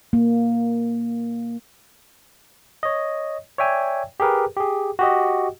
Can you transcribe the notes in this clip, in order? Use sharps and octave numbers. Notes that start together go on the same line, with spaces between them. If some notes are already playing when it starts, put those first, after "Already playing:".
A#3
C#5 D#5
C#5 D5 E5 G5 G#5
G4 G#4 A#4 B4
G4 G#4
F#4 G4 D#5